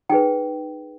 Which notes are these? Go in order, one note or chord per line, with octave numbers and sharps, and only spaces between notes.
D#4 G#4 B4 G5